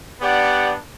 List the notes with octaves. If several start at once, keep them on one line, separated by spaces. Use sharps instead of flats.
B3 D4 G4 D5 F#5